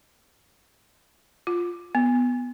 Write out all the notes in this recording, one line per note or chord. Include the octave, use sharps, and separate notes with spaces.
F4
B3